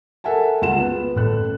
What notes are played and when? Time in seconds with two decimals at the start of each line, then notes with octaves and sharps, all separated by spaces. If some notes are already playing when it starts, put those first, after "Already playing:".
0.24 A4 A#4 E5 F#5 G#5 A5
0.62 C#2 F4 F#5 E7
0.79 B3
1.16 A1 A4 F#6